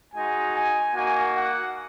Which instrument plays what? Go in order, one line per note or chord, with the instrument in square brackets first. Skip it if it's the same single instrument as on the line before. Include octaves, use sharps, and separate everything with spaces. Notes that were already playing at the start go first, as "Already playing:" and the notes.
[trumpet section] G#3 D#4 F#4 G#5
G#5
A#3 D#4 F#4 G#5
F#5